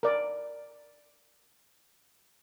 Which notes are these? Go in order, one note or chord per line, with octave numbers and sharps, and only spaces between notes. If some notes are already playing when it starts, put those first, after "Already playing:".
A#4 D5